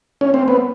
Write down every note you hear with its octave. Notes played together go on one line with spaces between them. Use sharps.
C#4
C4
B3